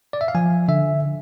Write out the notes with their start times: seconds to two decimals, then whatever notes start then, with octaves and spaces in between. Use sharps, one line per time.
0.13 D5
0.21 E5
0.28 F5
0.35 F3 G#5
0.68 D3 E5